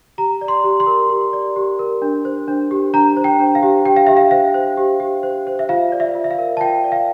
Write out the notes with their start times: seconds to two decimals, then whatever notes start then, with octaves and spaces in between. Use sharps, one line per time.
0.18 G4 A#5
0.41 D5
0.48 C6
0.64 G4
0.80 C6
0.87 A#4
1.09 G4
1.33 D5
1.56 G4
1.79 A#4
2.02 D4
2.25 C5
2.48 D4
2.71 G4
2.94 D4 A#5
3.17 C5
3.24 G5
3.40 D4
3.55 F5
3.63 G4
3.85 G4 G5
3.96 F5
4.07 G4 E5
4.17 F5
4.31 C5 F5
4.54 C5
4.77 G4
5.00 G4
5.23 C5
5.47 C5
5.59 E5
5.69 F4 F5
5.92 D5
6.00 E5
6.15 F4
6.24 E5
6.31 F5
6.38 A#4
6.57 A5
6.61 F4 G5
6.84 D5
6.92 F5